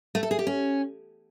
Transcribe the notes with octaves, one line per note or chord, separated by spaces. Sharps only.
A3
A4
G#4
G4
C#4